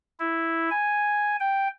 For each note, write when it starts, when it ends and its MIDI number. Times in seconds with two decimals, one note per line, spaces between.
0.20 0.70 64
0.70 1.36 80
1.40 1.68 79